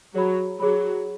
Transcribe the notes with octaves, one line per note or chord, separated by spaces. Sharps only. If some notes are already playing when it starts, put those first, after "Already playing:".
F#3 G#4 C#5 B5
F#3 G#4 C#5 B5